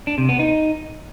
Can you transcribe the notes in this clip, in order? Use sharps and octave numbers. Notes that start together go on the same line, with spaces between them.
D4
C3
B3
D#4